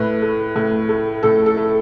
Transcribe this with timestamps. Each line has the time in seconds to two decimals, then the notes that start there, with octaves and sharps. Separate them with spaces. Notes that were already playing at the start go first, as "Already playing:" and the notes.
Already playing: A2 B4
0.22 A3
0.56 A2
0.89 A3
1.23 A2 A4
1.46 A4
1.57 A3